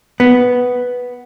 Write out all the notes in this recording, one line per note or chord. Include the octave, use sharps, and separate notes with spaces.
B3